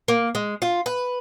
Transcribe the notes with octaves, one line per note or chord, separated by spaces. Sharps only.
A#3
G#3
F4
B4